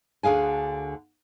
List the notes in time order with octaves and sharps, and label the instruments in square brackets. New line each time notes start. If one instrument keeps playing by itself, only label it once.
[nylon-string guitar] D2 D3 G#4 F5 G#5